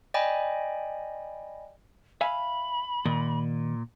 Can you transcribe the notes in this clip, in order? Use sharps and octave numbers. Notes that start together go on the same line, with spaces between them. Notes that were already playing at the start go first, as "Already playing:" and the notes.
D5 D#5 G5 G#5 B5
E5 F5 G#5 B5
A#2 D#3